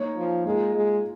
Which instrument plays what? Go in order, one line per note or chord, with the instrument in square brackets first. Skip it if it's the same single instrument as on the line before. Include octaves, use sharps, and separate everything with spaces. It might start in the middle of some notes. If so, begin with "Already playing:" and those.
Already playing: [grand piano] A#3 D#4 C#5
[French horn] F3
[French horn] G#3 [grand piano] A#3 F4 A#4
[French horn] G#3